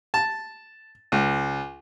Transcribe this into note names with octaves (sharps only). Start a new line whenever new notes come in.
A5
C#2